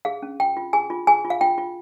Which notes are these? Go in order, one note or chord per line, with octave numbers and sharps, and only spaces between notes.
G#4 F5
C#4
F4 G5
F4
G#4 G#5
F4
G#4 G#5
F4
F5
F4 G5
F4